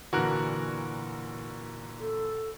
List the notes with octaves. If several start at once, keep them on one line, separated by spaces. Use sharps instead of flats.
A#2 D3 E3 F#4 A#4 F#6
A4